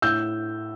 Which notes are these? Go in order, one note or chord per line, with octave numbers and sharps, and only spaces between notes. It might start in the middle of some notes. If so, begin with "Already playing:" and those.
A2 E6 G6